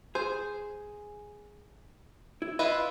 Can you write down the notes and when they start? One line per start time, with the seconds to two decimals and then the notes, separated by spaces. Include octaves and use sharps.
0.15 G#4 C5
2.42 E4
2.59 E4 F4 B4 D#5